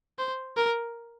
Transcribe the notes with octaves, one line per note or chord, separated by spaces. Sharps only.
C5
A#4